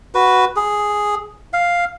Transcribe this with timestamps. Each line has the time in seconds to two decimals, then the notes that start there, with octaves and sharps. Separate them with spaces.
0.15 F#4 B4
0.56 G#4
1.53 F5